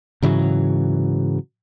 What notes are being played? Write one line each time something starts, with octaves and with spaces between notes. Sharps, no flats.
G#2 C#3 E3 F#3